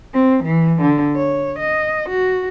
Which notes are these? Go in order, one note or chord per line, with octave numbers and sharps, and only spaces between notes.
C4
E3
D3
C#5
D#5
F#4